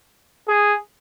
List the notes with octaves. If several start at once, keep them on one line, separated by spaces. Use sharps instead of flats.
G#4